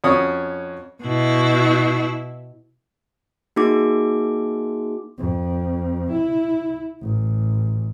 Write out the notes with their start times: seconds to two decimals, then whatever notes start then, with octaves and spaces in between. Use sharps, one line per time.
0.04 F2 C#4 F#4 C#5 D#6
1.03 B2 E4
3.56 A#3 D#4 F#4 G#4 D6
5.18 F2
6.11 E4
7.01 A1